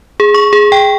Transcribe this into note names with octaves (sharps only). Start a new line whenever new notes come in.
G#4
C#6
G#4
G5